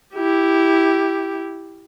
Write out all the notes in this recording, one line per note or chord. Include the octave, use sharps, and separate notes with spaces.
E4 G4